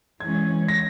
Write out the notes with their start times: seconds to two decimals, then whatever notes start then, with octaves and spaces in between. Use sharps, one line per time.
0.20 E3 G#3 C#4 G#6
0.68 A#6